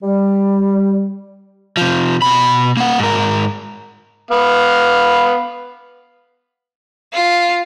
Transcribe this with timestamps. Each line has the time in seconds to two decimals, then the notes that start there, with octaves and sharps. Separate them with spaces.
0.02 G3
1.77 C3 F3
2.22 B2 B5
2.77 A#3 F#5
2.99 G#2 A#4
4.31 B3 F5
7.14 F4